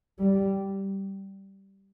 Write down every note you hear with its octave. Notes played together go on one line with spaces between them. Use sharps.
G3